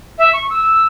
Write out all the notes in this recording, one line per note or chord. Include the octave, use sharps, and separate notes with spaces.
E5
C#6
E6